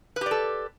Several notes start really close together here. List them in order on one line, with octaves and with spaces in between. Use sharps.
B4 G4 D5 A4